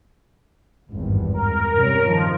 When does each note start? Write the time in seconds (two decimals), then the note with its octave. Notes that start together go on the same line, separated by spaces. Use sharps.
0.92 G#1 E2 G2
1.34 A#4
1.75 C3 G3 C#4
2.05 G2 D#3 F3